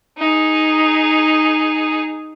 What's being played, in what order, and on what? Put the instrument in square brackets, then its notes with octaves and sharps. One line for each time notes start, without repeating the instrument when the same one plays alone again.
[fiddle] D#4 G#4